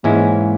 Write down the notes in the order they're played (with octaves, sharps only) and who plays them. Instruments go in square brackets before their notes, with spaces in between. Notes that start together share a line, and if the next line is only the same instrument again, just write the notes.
[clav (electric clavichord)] G#2 E3 G#3 C#4 E4 [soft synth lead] A#3